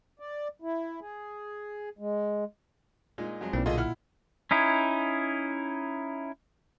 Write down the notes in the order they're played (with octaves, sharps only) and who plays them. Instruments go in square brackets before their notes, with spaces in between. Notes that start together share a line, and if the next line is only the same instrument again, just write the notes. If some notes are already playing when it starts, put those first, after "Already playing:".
[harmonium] D5
E4
G#4
G#3
[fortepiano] A#2 G#3 D#4
F2 F#3 G#3
[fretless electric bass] B1 [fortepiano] E3 G3 D4 [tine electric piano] A#3 C4
[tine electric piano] A#2 [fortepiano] D3 D#3 [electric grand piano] F4 G#4 D#5
[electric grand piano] E4 [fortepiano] F#5 F6
[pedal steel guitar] C#4 D#4 E4